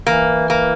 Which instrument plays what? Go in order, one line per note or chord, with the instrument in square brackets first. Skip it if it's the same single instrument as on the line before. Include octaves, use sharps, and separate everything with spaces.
[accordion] E3 [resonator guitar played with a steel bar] A#3
[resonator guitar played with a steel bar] A#3